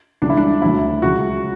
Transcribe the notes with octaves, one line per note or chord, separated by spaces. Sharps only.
C#2 C#3 E3 G3 D4
E4
D4
D2 D3 F#3 E4
C#2 C#3 F#3 F#4